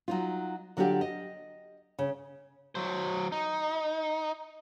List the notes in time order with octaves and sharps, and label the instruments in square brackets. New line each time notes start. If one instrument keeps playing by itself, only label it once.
[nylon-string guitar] F#3 D#4 F4
D3 F#3 D4 F4 G4
D#5
C#3
[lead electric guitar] F#3 C5
D#4